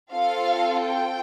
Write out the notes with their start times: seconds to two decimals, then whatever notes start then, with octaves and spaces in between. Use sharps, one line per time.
0.12 C4 F4 A4 F5
0.84 G5